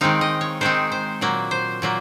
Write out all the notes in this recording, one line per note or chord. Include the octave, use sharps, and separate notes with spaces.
D#3 G#3 C4 D#4 F5
D#5
C#5
D#3 G#3 C4 D#4 C5
C5
A#2 F#3 A#3
C5
A#2 F#3 A#3